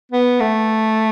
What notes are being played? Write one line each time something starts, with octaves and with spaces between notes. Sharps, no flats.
B3
A3